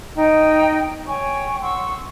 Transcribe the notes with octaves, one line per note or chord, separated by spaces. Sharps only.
D#4 D#5 G5
C#5 G5 G#5 C#6
F#5 C6 C#6 E6